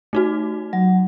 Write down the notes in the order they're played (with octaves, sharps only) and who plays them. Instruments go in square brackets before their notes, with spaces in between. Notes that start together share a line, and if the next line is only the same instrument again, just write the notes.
[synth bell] A3 D#4 F#4
[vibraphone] F#3